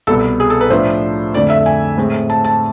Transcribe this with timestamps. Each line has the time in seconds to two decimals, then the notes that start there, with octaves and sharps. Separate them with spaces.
0.07 C2 B2 B3 A4
0.40 G#4
0.50 A4
0.61 B4
0.70 A2 F3 A3 D4 C5
1.34 F2 D3 A3 D5
1.50 E5
1.66 G#5
1.97 A2 G#3 C4
2.30 A5
2.45 A5